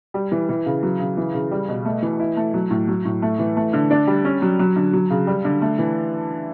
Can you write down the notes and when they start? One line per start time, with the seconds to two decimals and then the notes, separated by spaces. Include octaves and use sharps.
0.14 G3
0.32 E3
0.49 E3
0.66 C#3
0.83 F#3
1.00 C#3
1.17 E3
1.34 C#3
1.51 G3
1.69 B2
1.85 A3
2.02 E3
2.19 E4
2.37 A3
2.54 F#3
2.70 A2
2.88 F#3
3.05 A2
3.22 A3
3.39 E3
3.57 A3
3.73 D3
3.91 D4
4.07 G3
4.25 C#4
4.42 F#3
4.59 F#3
4.76 D3
4.93 F#3
5.10 C#3
5.27 G3
5.45 D3
5.62 A3
5.78 E3